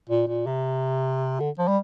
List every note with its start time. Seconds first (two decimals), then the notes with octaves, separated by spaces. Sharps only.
0.09 A#2
0.27 A#2
0.47 C3
1.40 D3
1.59 F3
1.68 G3